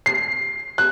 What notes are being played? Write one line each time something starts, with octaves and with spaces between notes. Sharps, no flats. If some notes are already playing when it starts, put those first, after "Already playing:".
C7
F#6